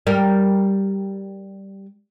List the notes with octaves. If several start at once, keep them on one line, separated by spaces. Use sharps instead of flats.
G3 A#4